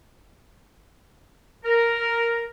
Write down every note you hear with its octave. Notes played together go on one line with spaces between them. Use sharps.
A#4